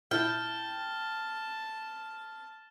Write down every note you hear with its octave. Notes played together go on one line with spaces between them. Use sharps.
A#2 E4 G5 A5 F6